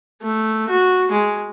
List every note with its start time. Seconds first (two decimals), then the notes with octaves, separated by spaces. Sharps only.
0.22 A3
0.70 F#4
1.11 G#3